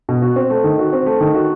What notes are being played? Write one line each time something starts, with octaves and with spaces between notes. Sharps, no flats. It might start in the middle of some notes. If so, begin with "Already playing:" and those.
B2
F#4
C4
A3
D#3
F#4
C4
A3
D#3
F#4